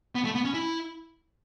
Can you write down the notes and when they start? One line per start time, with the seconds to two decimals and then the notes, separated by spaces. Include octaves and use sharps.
0.15 B3
0.24 A3
0.35 B3
0.45 C#4
0.54 E4